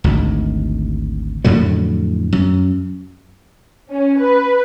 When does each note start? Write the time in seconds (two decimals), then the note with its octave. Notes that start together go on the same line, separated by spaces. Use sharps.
0.04 G#1 D2
1.45 F2 A2 D3 F#3
2.33 F#2
3.90 C#4
4.20 B4